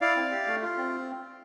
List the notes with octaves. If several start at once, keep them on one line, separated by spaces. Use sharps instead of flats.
E4 D5 F5
C4
G4
A3
F4
C4